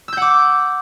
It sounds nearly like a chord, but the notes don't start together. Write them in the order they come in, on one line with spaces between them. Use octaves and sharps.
E6 G6 F#5 D6